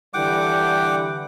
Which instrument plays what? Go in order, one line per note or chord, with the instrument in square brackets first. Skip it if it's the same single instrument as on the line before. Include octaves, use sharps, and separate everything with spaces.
[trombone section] D3 E3 G3 [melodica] F#5 G5 D6